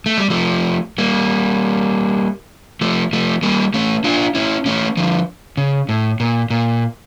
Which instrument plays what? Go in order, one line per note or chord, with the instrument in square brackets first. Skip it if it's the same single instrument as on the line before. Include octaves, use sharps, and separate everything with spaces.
[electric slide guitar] A3
G3
F3 A3
G3 A#3
F3 A3
F3 A3
G3 A#3
A3 C#4
D4 F4
C#4 E4
A3 C#4
D3 F3
C#3
A2
A#2
A#2